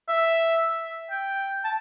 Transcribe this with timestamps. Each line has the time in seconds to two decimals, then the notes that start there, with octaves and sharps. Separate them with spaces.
0.08 E5
1.11 G5
1.64 A5